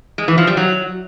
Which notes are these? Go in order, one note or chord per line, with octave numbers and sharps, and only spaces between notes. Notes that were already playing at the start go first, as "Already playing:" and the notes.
G#3
E3
F3
G3
F#3